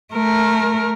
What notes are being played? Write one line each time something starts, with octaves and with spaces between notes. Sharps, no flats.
A3 A#4